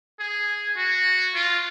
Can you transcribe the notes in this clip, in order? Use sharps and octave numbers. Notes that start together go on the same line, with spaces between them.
G#4
F#4
F4